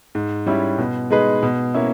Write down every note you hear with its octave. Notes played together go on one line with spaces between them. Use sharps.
G#2
G3 C#4 E4
B2
G#3 D#4 G#4 B4
B2
A#3 C#4 E4